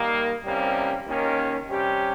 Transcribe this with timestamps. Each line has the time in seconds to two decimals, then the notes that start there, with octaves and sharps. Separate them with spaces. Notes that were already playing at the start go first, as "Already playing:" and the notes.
Already playing: D#3 G3 A#3
0.45 C2 C3 G3 A#3 C#4
1.06 D#2 D#3 A#3 C#4
1.68 C3 G3 C#4 G4